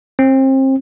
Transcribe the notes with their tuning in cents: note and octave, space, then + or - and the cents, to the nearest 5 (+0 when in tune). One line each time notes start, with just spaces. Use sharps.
C4 +30